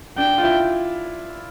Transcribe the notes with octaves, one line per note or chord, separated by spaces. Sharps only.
D4 G5
F4
E4